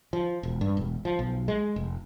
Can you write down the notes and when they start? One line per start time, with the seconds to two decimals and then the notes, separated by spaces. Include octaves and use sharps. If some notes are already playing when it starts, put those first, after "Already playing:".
0.13 F3
0.43 E1
0.61 G2
0.77 E1
1.05 F3
1.19 B1
1.48 G#3
1.76 F1